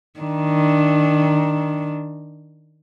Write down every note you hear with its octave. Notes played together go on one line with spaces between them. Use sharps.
D#3 D4